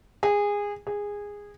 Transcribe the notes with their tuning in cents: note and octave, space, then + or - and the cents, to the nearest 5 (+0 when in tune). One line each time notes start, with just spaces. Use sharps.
G#4 -20
G#4 -15